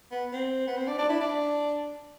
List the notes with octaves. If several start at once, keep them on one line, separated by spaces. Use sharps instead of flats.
B3
C4
B3
C4
D4
D4
E4
D4